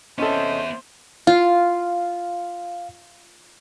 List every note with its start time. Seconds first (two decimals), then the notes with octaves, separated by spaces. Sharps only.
0.18 C3 B3 C#4 A4 C5 D#5 E5
1.27 F4 F5